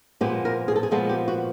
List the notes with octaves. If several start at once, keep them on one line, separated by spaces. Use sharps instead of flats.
A#2 F3 G#3 B3 G4
A#4
G#4
A4
G#4
A#2 F3 G#3 B3 A4
G4
F#4